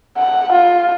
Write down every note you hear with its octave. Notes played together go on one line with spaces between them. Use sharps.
F#5
F4